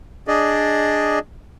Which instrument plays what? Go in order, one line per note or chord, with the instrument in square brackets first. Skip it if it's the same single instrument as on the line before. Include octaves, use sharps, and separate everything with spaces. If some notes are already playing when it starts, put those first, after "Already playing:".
[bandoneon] D4 G#4 D5 D#5